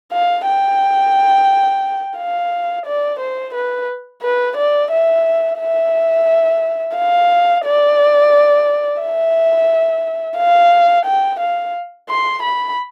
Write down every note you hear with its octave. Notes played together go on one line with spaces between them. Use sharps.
F5
G5
F5
D5
C5
B4
B4
D5
E5
E5
F5
D5
E5
F5
G5
F5
C6
B5